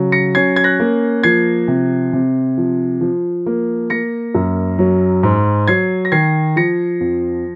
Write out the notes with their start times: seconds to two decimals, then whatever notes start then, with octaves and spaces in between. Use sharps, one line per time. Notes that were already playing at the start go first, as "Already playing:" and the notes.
Already playing: C#3 F#3
0.12 A#6 C#7
0.35 C#4 G#6 C7
0.56 G#6
0.64 F#6 A#6
0.80 A#3
1.23 F3 G#6 C7
1.68 C3
2.13 C3
2.58 F3
3.01 F3
3.46 A#3
3.90 A#3 A#6 C#7
4.35 F#2
4.79 F#3
5.23 G#2
5.68 F#3 G#6 C7
6.05 A#6
6.12 D#3 G#6 C7
6.56 F3 A#6 C#7
7.00 F2